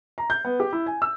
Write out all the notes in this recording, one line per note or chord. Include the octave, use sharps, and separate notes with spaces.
A#5
G6
B3
G4
E4
G#5
E6